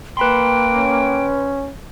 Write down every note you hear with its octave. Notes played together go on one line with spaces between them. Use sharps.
A#3 B4 G5 B5 C6
C#4